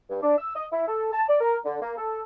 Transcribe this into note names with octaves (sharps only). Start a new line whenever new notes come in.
G2
D4
E6
D#5
E4
A4
A5
D5
A#4
D3
A#3
A4